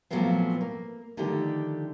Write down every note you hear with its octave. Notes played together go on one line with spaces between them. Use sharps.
A#2 F3 F#3 A3 B3 C4
A#3
D3 D#3 F3 A3 G4 D5